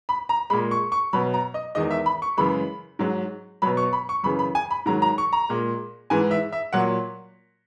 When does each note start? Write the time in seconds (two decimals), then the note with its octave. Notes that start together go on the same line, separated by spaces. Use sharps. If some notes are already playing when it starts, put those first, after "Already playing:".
0.09 B5
0.29 A#5
0.50 G#3 B5
0.53 A#2
0.71 C#6
0.92 C#6
1.13 B2 F#3 B5
1.34 A#5
1.54 D#5
1.75 E2 D#3 G#3 D#5
1.91 E5
2.06 B5
2.22 C#6
2.37 F#2 C#3 E3 G#3 B5
2.99 G#2 F#3
3.62 B2 F#3 B5
3.77 C#6
3.93 B5
4.09 C#6
4.23 F#2 C#3 E3 B5
4.39 B5
4.55 G#5
4.71 B5
4.86 G#2 D#3 F#3 A#5
5.02 A#5
5.18 C#6
5.33 A#5
5.49 A#2 G#3
6.10 G#2 E3 G#3 G#5
6.31 E5
6.52 E5
6.73 A#2 F#3 F#5